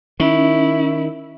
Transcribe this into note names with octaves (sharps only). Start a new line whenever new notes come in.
D#3 C#4 E4